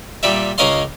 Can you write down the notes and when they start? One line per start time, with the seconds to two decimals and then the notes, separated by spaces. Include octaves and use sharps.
0.23 A#2 G3 G4 E5
0.58 C#2 C#4 A#4 D#5 F5 C6